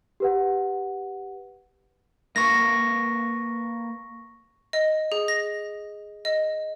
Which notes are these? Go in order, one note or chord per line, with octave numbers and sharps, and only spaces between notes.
G4 B4 F#5
A#3 B4 F5 C#6 A#6
D#5
G#4
A#6
D#5